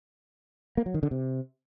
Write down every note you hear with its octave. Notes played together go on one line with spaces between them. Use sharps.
A#3
F#3
D#3
D3
C3